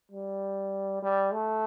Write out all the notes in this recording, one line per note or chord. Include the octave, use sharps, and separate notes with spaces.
G3
G3
A3